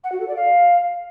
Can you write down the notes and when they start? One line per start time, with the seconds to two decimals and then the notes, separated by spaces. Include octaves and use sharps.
0.04 F#5
0.12 F#4
0.20 A4
0.28 D5
0.36 F5